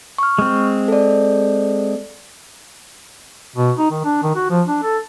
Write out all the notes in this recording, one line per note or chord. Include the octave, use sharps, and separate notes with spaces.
C#6 F6
G#3 C4
A4 D5
B2
D#4
D#3
D4
D#3
F#4
F3
D4
A4